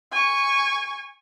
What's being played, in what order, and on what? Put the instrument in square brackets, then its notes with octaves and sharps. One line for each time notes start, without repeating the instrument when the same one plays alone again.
[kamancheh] G#5 C#6